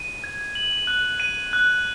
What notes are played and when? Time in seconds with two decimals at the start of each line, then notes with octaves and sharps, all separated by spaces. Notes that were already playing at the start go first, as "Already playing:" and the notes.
Already playing: D#7
0.24 G#6
0.55 F#7
0.87 F#6
1.20 D#7
1.53 F#6